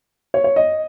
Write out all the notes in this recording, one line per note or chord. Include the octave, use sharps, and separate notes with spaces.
C#5
C#5
D#5